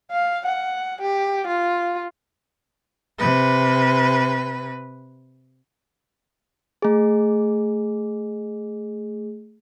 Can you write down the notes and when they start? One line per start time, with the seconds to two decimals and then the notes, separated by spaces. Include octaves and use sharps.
0.11 F5
0.47 F#5
1.01 G4
1.47 F4
3.18 C3 B4
6.82 A3 G#4